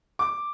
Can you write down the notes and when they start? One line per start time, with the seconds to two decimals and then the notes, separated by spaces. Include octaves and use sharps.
0.19 D6